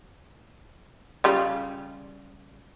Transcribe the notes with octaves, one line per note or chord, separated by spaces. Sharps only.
C#3 G3 F4